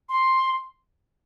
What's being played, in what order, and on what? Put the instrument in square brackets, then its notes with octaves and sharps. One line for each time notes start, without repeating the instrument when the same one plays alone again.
[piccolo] C6